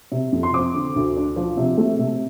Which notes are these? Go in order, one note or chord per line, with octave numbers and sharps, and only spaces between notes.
C3
F2
C6
C4 D6
D3
D2
D4
F3
C3
A3
C3